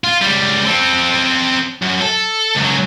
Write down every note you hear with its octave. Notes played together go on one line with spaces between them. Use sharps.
F4
C#2 G3
C4 A4
F#2
A4
C#2 F#3